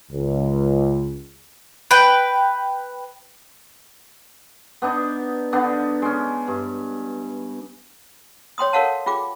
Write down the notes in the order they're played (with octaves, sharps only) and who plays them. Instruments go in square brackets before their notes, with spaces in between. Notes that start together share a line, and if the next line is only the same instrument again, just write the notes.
[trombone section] C#2
[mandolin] B4 G5
[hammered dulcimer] B3 D4 D#4
D3 B3 D4 D#4
G#3 C#4
G2
[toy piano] C#5 G5 C6 D#6
A4 A#4 C#5 F5 F#5 A5
F4 G#4 G5 D6